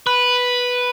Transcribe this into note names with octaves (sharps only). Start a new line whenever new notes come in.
B4